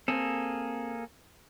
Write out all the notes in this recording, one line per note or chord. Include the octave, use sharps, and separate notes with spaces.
A#3 C4 G#4 A4